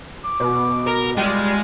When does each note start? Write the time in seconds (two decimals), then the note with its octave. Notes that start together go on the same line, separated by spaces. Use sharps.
0.25 D6
0.40 B2
0.87 A#4
1.17 G3 G#3 F4